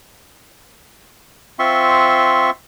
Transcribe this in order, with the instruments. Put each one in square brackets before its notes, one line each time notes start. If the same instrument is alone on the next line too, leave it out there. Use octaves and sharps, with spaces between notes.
[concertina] C4 F4 E5 C6 C#6